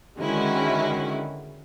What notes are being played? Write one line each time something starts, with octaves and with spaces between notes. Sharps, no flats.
D3 D#3 G#3 C#4 E4 F#4